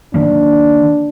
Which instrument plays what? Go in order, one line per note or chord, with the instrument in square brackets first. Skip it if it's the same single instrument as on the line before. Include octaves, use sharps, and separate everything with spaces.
[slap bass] D#3 F#3 A#3 [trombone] D4